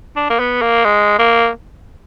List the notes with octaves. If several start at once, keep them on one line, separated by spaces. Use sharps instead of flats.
D4
A#3
B3
A#3
G#3
A#3